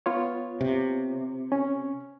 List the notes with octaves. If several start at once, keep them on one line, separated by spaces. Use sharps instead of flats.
B3 F4 C#5
C3
C#4